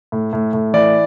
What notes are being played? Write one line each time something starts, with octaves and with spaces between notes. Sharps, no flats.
A2
A2
A2
E3 D5